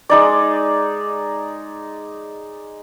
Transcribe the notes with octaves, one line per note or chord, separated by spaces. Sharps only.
G#3 D#4 D5